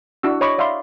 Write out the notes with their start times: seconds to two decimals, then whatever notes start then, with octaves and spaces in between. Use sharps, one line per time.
0.23 D4 E4 F#4 E6
0.41 C#5 D#5 B5 C#6 D6
0.58 D5 E5 F5 B5 C6